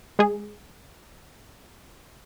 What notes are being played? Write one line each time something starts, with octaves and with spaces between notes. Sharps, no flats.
G#3 G#4